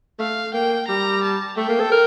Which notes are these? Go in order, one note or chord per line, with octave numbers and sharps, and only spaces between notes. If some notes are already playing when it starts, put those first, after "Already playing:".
A3 F5
A#3 G5
G3 A#5
A5
A3 G5
A#3
A4
A#4